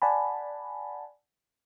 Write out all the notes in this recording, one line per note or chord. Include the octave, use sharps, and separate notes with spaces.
D5 F#5 G#5 A5 B5